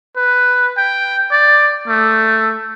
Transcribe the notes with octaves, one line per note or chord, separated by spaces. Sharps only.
B4
G5
D5
A3